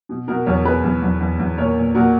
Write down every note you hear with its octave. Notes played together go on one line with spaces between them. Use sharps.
B2
B2 F#4 A#4
E2 A#4 C#5
B2 G#4 B4
E2
E2
E2
E2
A#2 A#4 C#5
A#2
A#2 F#4 A#4